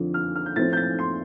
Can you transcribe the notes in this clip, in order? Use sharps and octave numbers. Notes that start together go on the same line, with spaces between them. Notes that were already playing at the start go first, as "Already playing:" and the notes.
Already playing: F2 D3 F3
F6
F6
G6
A2 F3 C4 A6
G6
A6
C6